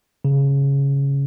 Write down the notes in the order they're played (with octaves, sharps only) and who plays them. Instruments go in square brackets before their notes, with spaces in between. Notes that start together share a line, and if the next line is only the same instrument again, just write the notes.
[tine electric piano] C#3